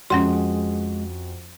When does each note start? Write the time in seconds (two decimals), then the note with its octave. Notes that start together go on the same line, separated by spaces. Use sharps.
0.10 F2 G#3 C#4 F#4 F#5 C6